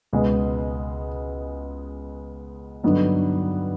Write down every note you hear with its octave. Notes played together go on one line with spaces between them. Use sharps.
C#2 B2 G#3 B3
G2 D3 F#3 B3 D#4